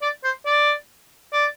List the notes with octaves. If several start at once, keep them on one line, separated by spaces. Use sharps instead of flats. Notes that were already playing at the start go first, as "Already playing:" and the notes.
D5
C5
D5
D5